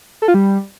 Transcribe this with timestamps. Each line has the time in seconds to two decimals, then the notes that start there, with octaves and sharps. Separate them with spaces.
0.22 A4
0.28 F4
0.34 G3